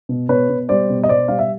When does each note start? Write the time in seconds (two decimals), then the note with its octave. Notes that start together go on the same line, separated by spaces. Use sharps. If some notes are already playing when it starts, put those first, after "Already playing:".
0.09 B2
0.29 B2 B4 C#5
0.50 B2
0.69 G3 C5 D5
0.90 B2
1.03 D#5
1.09 B2 C5 D5
1.28 G3 F5
1.39 E5